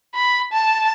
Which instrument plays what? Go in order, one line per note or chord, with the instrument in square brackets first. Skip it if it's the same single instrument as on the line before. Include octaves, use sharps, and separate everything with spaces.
[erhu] B5
A5